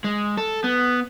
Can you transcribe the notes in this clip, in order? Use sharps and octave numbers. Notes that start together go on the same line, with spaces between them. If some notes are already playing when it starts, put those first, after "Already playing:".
G#3
A4
B3